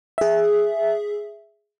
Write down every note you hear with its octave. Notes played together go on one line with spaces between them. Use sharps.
G#4 E5